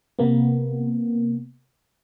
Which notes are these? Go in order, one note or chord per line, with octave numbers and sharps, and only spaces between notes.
C3 A#3 B3